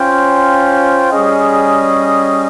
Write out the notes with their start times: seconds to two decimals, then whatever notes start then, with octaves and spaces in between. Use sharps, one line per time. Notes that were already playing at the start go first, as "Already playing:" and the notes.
Already playing: C#4 F4 C5 G5
1.11 G3 C#4 G#4 D#5